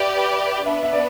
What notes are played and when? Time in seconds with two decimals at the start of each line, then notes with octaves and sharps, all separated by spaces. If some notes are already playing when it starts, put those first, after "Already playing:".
Already playing: G4 B4 D5 E5
0.65 B3 D4 B4 E5
0.83 E5
0.93 D5